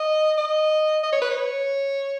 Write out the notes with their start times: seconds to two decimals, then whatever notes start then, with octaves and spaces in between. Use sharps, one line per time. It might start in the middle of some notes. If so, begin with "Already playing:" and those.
Already playing: D#5
0.38 D#5
1.03 D#5
1.12 C#5
1.22 B4
1.31 C#5